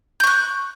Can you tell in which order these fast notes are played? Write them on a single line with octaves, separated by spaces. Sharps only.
G6 C#6 F#6